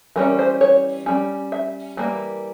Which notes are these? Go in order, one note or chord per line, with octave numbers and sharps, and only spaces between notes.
E3 G3 C#4 A#4
C5
C#5
G3 C#4
E5
E3 G3 A#3